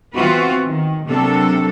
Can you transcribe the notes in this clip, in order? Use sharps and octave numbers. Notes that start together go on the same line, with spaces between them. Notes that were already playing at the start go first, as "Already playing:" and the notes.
E3 B3 C4 F4 F#4 B4
D#3
C3 F#3 A#3 D4 A4